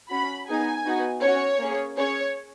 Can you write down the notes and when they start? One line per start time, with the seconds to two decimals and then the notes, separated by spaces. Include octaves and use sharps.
0.10 C#4 F#4 B5
0.48 B3 D#4 G#4 G#5
0.85 B3 D#4 F#4
1.22 C#4 F#4 C#5
1.59 A#3 C#4 G#4
1.97 C#4 G#4 C#5